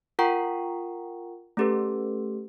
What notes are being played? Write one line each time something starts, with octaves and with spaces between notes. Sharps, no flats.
F4 A#4 F#5 G5 A#5 C#6
A3 C#4 G4 A4 B4